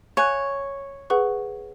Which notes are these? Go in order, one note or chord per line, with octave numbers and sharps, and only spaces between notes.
C#5 F5 G#5 C#6 F#6
G#4 B4 F#5 C#6